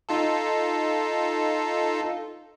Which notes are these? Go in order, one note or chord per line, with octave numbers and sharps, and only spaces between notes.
D#4 F4 A4